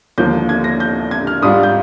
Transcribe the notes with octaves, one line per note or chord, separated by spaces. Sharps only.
D#2 D3 F3 A#3 G6
G#6
A#6
G6
G#6
F6
G#2 G3 D4 F4 D#6
G6